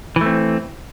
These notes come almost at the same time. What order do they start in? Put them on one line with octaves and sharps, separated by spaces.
E3 A3 C4